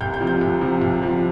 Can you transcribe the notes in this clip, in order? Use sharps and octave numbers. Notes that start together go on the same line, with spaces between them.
C2 G6
G6
C3 F3
G6
C2
C3 F3
C2
C3 F3